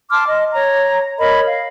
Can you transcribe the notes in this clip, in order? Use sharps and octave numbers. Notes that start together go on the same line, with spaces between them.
A5 C6 D6 F6
D#5
C#5 A#5
A#4 C#5 D#5 B5
F5